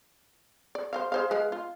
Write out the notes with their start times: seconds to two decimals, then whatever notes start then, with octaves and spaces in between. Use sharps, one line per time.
0.75 D5
0.93 C5 D#5 F5
1.12 G#4 C5 F5
1.31 G#3 B4 F5
1.52 F4